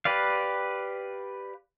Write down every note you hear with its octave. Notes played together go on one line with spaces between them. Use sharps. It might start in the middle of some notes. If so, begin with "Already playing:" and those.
G4 B4 D5 F5